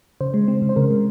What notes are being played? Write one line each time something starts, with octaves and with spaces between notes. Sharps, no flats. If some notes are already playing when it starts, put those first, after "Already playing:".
C#3 C5
G#3
C4
C#3
C5
C#3 A#4
G#3